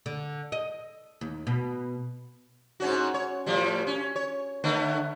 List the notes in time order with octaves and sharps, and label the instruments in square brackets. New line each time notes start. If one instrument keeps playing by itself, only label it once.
[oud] D3
D#5
D#2
B2
[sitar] G#2 C#4 F#4
C#5
A2 F3 G3
C#4
C#5
D3 A3 B3